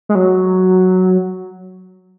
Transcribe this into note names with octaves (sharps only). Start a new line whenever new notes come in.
G#3
F#3